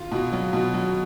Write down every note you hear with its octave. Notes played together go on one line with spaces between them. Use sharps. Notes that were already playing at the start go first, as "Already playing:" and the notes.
Already playing: F4
B2
F#3
B2
F#3